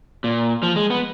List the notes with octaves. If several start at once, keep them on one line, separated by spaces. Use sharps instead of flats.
A#2
F3
G#3
B3